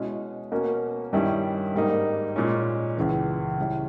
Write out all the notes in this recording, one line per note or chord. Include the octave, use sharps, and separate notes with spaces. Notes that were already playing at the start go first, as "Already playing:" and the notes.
Already playing: B2 G#3 C#4 E4
B2 A#3 C#4
G2 D#3 G3 C#4 E4
G#2 G3 A#3 D#4
A#2 G#3 C#4
C#2 C#3 E3
C#3 G3 C#4 E4